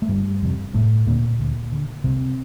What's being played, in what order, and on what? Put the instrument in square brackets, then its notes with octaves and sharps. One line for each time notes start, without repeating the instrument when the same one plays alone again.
[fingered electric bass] A3
G1 G2 G3
F2 C3
F1 A2 A3
D#2 A#2 D3 A#3
D2
D3
C2 C3 C4